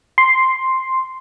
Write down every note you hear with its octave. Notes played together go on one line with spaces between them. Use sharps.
C6